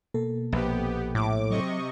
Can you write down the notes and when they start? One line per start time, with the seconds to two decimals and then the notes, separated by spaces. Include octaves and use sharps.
0.14 B2 A#3 A4
0.52 A#1 B3 G4
1.15 A2 D6
1.50 C3 F#3 D#5 C#6